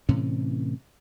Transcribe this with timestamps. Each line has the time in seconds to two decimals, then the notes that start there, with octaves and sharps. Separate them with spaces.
0.09 A2 C3 E3 C#4